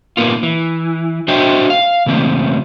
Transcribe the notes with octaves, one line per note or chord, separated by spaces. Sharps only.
A#2 D#3 F#3 A#3 B3 F4
E3
D4 F#4 C5 D#5 E5 G5
F5
C#3 E3 A3 A#3 C4